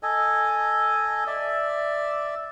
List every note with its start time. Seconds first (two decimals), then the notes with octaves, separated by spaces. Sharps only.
0.03 A4 D#5 G#5
1.27 D5 E5